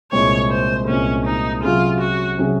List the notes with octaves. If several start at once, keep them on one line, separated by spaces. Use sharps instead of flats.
C2 A#2 G#3 C4 C#5
C5
C2 A#2 G#3 C4 C#4
D#4
C3 F#3 C#4 F4 G#4
F#4
C3 F#3 C#4 G#4